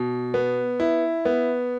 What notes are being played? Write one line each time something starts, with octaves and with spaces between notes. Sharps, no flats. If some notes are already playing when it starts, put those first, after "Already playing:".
Already playing: B2
B3
E4
B3